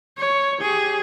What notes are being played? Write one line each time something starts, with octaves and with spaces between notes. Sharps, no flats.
C#5
G4 G#4